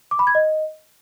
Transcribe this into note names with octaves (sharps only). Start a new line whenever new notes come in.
D6
B5
G#6
D#5